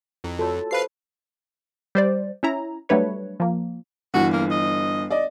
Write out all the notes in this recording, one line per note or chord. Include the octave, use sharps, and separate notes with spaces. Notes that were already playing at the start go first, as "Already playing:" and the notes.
F2 E4
F4 F#4 A4 C#5
G4 B4 C5 F5 B5 C7
G3 C5 D5
C#4 E4 A#5
F#3 G3 A3 D4 B4 C#5
F3 A#3
G1 E3 F#4
A#3
D#5
D5 D#5